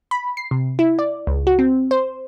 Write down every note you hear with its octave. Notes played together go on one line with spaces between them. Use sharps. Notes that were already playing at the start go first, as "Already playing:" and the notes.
B5
C7
C3
E4
D5
C#2
F#4
C4
C5